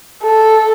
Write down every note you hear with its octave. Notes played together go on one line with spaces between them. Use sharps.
A4